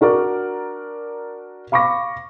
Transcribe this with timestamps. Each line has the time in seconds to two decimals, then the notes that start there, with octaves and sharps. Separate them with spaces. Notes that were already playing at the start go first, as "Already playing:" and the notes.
0.01 D4 F#4 A#4 D5
1.72 F5 B5 C#6 D6 A#6